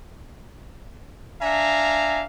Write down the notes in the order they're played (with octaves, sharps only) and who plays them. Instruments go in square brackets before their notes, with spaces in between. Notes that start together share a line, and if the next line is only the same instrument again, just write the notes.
[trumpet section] D4 E5 F5 G#5 A#5